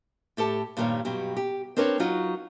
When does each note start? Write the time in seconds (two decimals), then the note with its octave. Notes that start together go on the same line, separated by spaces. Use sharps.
0.37 A2 G4 A4 A5
0.77 G2 A#2 D#3 G3 C#5
1.05 G2 B2 F#3 G4
1.37 G4
1.77 C4 D4 A#4 B4 C#5
1.99 F#3 D#4 F4 F#4